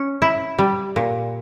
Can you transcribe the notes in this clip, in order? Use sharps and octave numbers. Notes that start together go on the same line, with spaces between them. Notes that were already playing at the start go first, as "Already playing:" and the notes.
Already playing: C#4
E4
G3
A#2